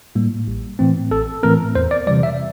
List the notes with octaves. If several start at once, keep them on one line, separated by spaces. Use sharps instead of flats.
A2 G3 A#3
A1
A2 E3 A3 C4
A1 A4
A2 E3 A3 C4 A#4
E2 C5
D5
C3 E3 G3 D5
E5